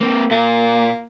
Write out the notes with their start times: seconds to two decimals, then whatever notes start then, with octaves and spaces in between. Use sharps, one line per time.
0.01 A#3 C4
0.31 A#2 A#3